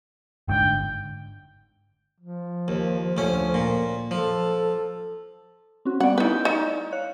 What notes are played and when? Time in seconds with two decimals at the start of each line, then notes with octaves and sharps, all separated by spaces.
0.48 G1 G#2 D3 G5
2.21 F3
2.68 D#2
3.17 D2 C#4
3.54 A#2
4.11 F3 A4
5.85 C4 C#4 F#4
6.00 G3 B3 D5 F#5
6.18 D#4 E4 B4 D5 G6
6.45 D#4
6.92 C#5 F5 F#6